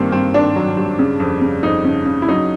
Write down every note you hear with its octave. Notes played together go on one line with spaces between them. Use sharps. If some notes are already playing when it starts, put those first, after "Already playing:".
Already playing: G2 D#3 A#3 C4
G2 C4
D#3 D4
F#3
G2
C#3
F2
C#3
F2 D#4
C#3
C#3
E4
F#3 D#4